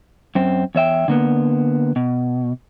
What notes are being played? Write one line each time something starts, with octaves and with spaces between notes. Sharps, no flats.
F#2 C4
E2 C#5 E5 G5
D3 A#3 B3
B2